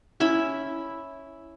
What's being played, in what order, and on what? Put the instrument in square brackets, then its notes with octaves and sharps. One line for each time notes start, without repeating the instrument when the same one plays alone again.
[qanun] C#4 E4 E5 B5